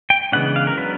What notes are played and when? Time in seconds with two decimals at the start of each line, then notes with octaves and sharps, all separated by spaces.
0.10 G5
0.32 C#3 E3 G#3 B3 D4 F#5
0.56 F5
0.67 A#4
0.77 F#3 B3 D4 B4